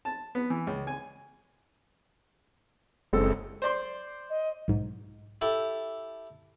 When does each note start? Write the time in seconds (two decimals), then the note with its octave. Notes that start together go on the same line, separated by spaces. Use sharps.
0.05 A5
0.35 B3
0.50 E3
0.67 C#2
0.87 G#5
3.13 F#1 G#3 C4 A4
3.62 C5 D5 C6
4.30 D#5
4.68 B1 G#2
5.41 E4 G4 A4